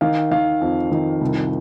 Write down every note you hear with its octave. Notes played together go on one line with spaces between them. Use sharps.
D#3 F5
D#3 F5
F2
D#3
C2